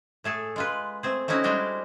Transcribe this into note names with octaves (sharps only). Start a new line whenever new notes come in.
A2 A3 G#4 A4
G#3 F4 B4
A3 C4 G#4
A3 C4 C#4 D#4 E4 F#4
G3 G#3 D4 F#4 G4